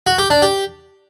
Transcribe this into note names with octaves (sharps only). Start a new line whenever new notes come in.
F#4
G4
D4
G4